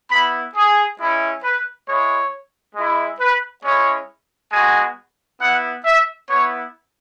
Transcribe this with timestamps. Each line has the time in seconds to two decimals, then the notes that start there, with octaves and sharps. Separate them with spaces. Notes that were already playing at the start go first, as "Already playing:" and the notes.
0.11 B3 E4 B5
0.56 G#4
0.99 G#3 C#4 E4
1.43 B4
1.87 G#3 E4 C#5
2.75 G#3 E4
3.20 B4
3.64 G#3 C#4 E4 C#5
4.52 G#3 B3 F#4 G#5
5.41 B3 E4 F#5
5.85 E5
6.30 B3 E4 C#5